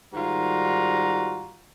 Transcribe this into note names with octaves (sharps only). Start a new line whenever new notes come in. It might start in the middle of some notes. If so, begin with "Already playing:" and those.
G#2 D#3 G3 F4 F#4 A#5